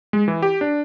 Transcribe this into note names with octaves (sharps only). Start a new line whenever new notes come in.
G#3
E3
G4
D4